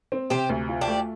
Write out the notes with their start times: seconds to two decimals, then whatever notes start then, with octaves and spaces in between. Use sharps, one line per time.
0.12 C4
0.30 C3 G4 C5
0.49 D2
0.69 F4
0.81 D4 G4
0.88 A3